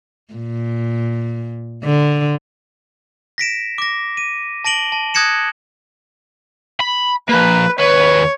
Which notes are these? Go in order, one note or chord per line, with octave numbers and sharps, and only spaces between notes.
A#2
D3
A#6 B6 D7 E7
D6 A#6
D#7
A5 A#6 D7 F#7 G7
A5
D#6 F#6 G#6 A#6 C#7 E7
B5
F3 A#3 B4
D#2 B4 C#5